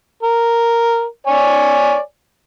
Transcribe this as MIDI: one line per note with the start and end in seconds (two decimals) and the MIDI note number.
0.23 1.04 70
1.27 1.98 73
1.27 1.98 74
1.27 1.98 80